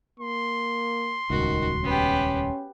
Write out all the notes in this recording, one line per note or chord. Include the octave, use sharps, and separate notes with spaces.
A#3 C6
D#1 G#1 C#2 D#3 F#4
B3 C#4 G4